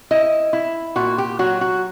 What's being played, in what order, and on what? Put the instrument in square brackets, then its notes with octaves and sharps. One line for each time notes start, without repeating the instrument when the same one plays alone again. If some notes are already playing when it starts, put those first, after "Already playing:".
[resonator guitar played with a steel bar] E4 D#5
E4
A#2 F#4
G4
F#3 F#4
F#4